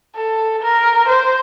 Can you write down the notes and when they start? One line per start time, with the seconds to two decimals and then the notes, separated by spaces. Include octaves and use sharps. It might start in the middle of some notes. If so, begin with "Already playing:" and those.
0.16 A4
0.62 A#4
1.08 C5